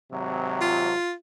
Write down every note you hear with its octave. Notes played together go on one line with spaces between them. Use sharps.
G#1 C3 F#3
F4